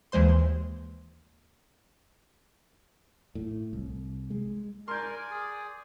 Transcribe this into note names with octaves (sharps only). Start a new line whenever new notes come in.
D#2 E3 G#3 C5 C6
A2
C2
G#3
A#4 D5 G#5 C6 G6
G#4